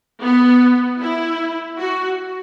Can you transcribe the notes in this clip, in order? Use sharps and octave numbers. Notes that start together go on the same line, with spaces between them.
B3
E4
F#4